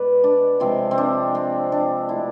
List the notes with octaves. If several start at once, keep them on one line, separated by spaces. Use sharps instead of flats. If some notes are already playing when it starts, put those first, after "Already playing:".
Already playing: B2 G#3 B4 D5
D4
C3 F3 G#3 C4
C4
D4
C4
D4
B2 A3 E4